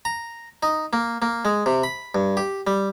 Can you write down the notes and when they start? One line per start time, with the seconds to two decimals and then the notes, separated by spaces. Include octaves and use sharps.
0.05 A#5
0.63 D#4
0.93 A#3
1.22 A#3
1.45 G#3
1.66 C3
1.84 B5
2.15 G2
2.37 G4
2.67 G3